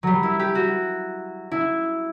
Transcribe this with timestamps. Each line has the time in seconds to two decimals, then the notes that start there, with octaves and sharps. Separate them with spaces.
0.03 F#3 G3
0.23 E4
0.39 G4
0.55 F#4
1.52 E4